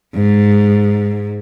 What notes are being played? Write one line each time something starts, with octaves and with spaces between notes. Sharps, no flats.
G#2